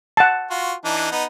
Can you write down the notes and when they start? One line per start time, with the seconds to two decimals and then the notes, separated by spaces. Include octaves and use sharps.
0.17 F#5 A5
0.51 F4 F#4
0.85 E3 D4 D#4
1.11 B3 D#4